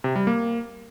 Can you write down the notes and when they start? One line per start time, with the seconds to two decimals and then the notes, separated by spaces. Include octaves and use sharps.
0.04 C3
0.16 G3
0.27 A#3